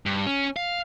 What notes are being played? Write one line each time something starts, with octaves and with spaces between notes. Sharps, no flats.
G2
C#4
F5